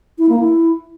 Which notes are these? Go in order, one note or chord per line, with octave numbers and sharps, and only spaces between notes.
E4
A#3
E4